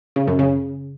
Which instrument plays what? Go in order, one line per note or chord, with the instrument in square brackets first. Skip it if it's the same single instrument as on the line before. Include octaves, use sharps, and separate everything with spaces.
[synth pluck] C#3
F#2
C#3